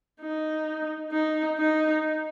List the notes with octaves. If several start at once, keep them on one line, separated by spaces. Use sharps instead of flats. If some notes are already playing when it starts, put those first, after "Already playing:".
D#4
D#4
D#4